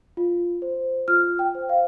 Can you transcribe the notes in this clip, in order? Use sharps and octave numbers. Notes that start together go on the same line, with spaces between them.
F4
C5
F4 F6
G5
C5
F5